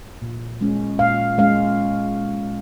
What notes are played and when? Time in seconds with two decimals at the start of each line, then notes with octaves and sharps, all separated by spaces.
0.22 A#2
0.61 G#3 C#4
0.99 A#2 F5
1.38 G#3 C#4 F5